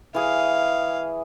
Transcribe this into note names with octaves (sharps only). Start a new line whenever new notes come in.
E3 G#4 F5